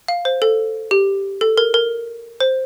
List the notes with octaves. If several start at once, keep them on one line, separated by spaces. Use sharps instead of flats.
F5
C5
A4
G4
A4
A#4
A#4
C5